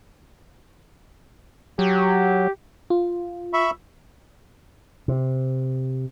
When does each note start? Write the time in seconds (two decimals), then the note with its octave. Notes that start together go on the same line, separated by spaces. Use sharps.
1.79 F#3 G4
2.90 F4
3.53 E5 B5 C#6
5.08 C3